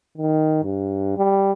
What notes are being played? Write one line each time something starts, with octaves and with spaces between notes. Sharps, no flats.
D#3
G2
G3